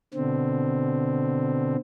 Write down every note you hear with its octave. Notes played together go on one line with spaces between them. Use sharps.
B2 D3 C4